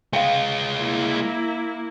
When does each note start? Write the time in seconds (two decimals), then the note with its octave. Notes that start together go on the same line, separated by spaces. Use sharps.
0.13 G#3 F4 F5 G5
0.80 A#3 E4